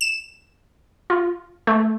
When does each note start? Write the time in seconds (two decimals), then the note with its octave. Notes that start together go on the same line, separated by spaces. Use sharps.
0.01 E7
1.10 F4
1.67 A3